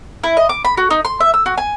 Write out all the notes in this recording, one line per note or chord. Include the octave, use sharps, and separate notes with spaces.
E4
D#5
D6
B5
F#4
D#4
C6
E5
E6
F#4
G#5